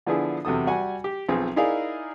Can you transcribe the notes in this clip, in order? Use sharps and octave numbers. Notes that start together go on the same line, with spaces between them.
D3 F3 B3 D4 E4 G#4
E2 C3 F#3 A4 D#6
G3 F#4 F#5 G#5
G4
B1 F3 C4 G#4
D#4 E4 G#4 A#4 D5 F5